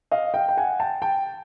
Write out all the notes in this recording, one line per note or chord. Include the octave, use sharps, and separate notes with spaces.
D#5 F5
F5 G5
G5
F#5 G#5
G5 A5
G5 A5